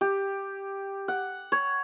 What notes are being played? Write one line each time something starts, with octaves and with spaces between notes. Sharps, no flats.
G4
F#5
C#5